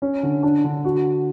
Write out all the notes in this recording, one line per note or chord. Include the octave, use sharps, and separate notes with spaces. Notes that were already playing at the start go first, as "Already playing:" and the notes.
C#4
D3
D4
D3
F#4